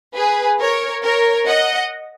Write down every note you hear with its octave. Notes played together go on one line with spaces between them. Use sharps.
G#4 B4
A#4 C#5
A#4 C#5
D#5 F#5